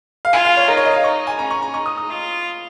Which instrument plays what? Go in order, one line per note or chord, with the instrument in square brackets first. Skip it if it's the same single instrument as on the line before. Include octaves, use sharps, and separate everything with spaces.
[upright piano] F5
[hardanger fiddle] F4 [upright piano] G#5
[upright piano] F5
C#5
[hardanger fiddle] D#4 [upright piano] A#4
[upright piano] C#5
D#5
F5
[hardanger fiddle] D#4 [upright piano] C#6
[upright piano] G#5
[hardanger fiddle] C#4 [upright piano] A#5
[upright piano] C#6
A#5
[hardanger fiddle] D#4 [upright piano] C#6
[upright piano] D#6
D#6
[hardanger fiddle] F4